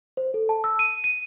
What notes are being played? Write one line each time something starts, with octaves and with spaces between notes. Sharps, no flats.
C5
A4
A5
E6
D#7
D#7